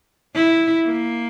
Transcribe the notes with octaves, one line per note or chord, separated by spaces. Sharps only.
E4
A#3